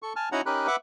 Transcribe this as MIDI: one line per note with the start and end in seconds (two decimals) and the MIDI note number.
0.02 0.13 69
0.02 0.13 85
0.16 0.29 80
0.16 0.29 81
0.16 0.29 89
0.32 0.41 61
0.32 0.41 63
0.32 0.41 64
0.32 0.41 66
0.32 0.41 78
0.32 0.41 82
0.46 0.67 61
0.46 0.67 63
0.46 0.67 67
0.46 0.67 70
0.46 0.67 83
0.46 0.67 90
0.67 0.76 71
0.67 0.76 76
0.67 0.76 78
0.67 0.76 86